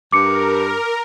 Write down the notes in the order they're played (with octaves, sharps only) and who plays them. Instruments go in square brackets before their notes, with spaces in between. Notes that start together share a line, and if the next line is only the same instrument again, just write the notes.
[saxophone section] G2 [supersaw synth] A#4 [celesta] D6 C#7